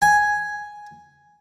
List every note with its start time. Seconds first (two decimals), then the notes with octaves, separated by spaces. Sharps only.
0.02 G#5